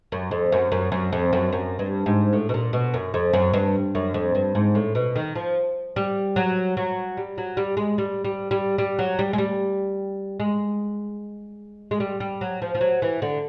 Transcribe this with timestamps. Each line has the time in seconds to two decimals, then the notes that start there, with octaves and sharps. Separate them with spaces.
0.12 F#2
0.31 F2
0.52 F#2
0.72 F#2
0.92 F#2
1.13 F2
1.33 F#2
1.52 F#2
1.79 G2
2.06 G#2
2.33 A2
2.49 B2
2.54 A#2
2.73 B2
2.94 F#2
3.14 F2
3.33 F#2
3.54 G2
3.95 F#2
4.14 F2
4.35 G2
4.55 G#2
4.75 A2
4.95 B2
5.16 D#3
5.35 F3
5.96 G3
6.36 F#3
6.77 F#3
7.17 G3
7.38 F#3
7.57 G3
7.77 G#3
7.98 G3
8.25 G3
8.51 G3
8.78 G3
8.99 F#3
9.19 G3
9.33 G#3
9.38 G3
10.40 G#3
11.91 G#3
12.00 G3
12.20 G3
12.41 F#3
12.62 F3
12.75 F3
12.81 F#3
13.02 E3
13.22 D3